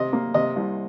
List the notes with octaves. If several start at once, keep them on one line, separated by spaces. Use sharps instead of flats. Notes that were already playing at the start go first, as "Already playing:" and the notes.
Already playing: C3 D#5
A#3
C3 D#5
C2